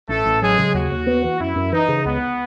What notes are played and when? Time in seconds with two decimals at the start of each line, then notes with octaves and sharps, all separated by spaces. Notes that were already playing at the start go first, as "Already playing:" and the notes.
0.09 A1 A3 A4
0.26 A1
0.42 F#3 G#3 G#4
0.58 C#3
0.74 D#2 F#4
0.91 D#2
1.07 B3
1.24 E3
1.40 F#2 E4
1.56 F#2
1.72 E3 D#4
1.89 C#3
2.06 C#2 B3